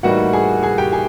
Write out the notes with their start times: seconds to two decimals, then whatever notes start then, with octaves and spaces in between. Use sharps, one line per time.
0.03 A2 E3 G3 A#3 D#4 F#4 F#5
0.33 G#4 G#5
0.63 G#4 G#5
0.78 G4 G5
0.93 G#4 G#5